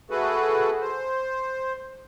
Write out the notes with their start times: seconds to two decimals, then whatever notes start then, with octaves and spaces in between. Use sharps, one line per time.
0.10 A3 F#4 G#4 A4 B4
0.81 C5